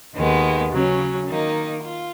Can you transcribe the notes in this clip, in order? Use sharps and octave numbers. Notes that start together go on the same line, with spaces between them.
D#2 D#3 G#3 B3
C#3 F#3 C#4
D#3 A#3 D#4
F4